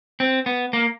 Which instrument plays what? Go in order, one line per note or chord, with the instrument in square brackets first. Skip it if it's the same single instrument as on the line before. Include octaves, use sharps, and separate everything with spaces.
[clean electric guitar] C4
B3
A#3